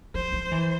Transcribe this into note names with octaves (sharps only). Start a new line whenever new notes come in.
F3 C5
F3
E3